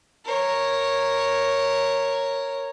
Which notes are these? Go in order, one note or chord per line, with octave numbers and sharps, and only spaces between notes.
A#4 C#5